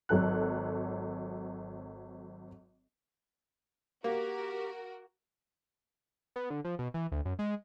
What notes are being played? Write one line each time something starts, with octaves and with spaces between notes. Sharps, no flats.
G#1 F#3 A4 F#6
A#3 F#4 G4 A#4
B3
D3
F3
B2
E3
D2
F#2
G#3